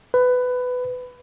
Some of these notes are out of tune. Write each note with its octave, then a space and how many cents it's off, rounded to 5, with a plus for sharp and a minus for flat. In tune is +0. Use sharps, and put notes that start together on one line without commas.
B4 +15